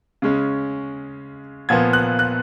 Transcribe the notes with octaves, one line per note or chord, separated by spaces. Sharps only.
C#3 G#3 C#4
A#2 F3 B3 G#6
F#6
F#6